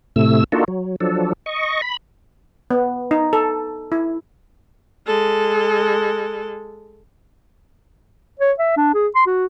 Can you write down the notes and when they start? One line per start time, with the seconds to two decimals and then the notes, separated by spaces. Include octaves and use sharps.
0.16 A2 C3 A3 E6
0.52 A#3 D4 D#4 F4 F#4 A4
0.68 F#3
1.01 F3 F#3 D4 A4
1.46 D#5 C#6
1.82 B5
2.71 B3
3.11 D#4
3.33 A4
3.92 E4
5.07 G#3 A4
8.40 C#5
8.59 E5
8.77 D4
8.94 G#4
9.15 C6
9.27 F#4